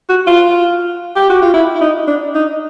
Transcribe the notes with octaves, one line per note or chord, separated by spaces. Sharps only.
F#4
F4
G4
F#4
F4
E4
E4
D#4
D4
D#4